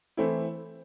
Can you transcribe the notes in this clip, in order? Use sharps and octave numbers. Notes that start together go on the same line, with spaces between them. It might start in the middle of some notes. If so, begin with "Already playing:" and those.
E3 A3 C4 E4